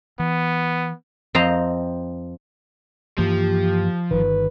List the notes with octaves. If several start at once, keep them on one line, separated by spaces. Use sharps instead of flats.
E3 B3
F2 C4 C5 D#5 A#5
G2 E3 F3 A#3 G4
G1 D#3 B4